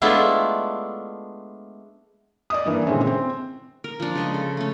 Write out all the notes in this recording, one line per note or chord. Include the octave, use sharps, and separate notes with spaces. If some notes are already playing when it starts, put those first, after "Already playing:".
G#3 A3 B3 D4 E4 F4
D5 D#5 D#6
G2 E3 A#3
A#2 D3 E3 G#3 C4 C#4
C4
A#4
F3 D4
C#3 G#3 C#6
A4
A3 C#4